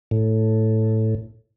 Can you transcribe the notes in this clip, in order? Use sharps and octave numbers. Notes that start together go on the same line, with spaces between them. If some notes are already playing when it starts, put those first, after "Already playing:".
A2